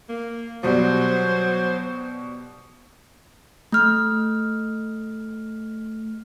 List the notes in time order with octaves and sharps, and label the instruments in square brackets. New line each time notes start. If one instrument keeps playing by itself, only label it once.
[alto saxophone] A#3
[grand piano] B2 G3 [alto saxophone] F#3 [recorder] C5
[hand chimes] A3 F6